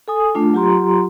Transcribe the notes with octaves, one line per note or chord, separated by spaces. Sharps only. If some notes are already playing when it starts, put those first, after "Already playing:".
A4 G#5 D#6
A3 D4 F4
F#3 F4 G4 A#5 C6